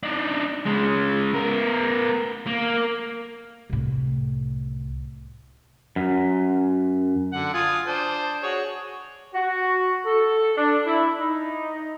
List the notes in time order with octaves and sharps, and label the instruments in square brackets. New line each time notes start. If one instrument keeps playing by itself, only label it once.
[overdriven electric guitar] D4 D#4
C#3 G#3
B3 A#4
A#3
[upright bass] C2 A2
[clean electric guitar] F#2
[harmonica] D3 F#5
F4 G#5 D#6
D4 C5
F#4 G#4 C#5
[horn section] F#4
A4
D4
E4
D#4